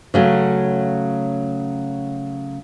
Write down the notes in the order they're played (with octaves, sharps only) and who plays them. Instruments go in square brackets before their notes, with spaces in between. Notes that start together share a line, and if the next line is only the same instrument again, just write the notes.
[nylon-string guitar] C#3 F#3 A3